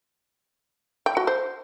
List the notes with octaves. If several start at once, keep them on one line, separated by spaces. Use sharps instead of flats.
G5
F#4
C5